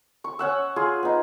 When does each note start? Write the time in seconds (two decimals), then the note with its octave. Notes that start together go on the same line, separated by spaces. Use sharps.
0.24 C#6
0.39 C#4 F#5 E6
0.76 F4 G#4 C6
1.03 B3 D#4